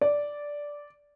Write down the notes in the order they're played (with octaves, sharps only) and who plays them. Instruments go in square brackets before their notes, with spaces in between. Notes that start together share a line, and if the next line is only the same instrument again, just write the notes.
[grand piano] D5